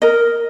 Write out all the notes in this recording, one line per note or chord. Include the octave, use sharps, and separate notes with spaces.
A#4 D#5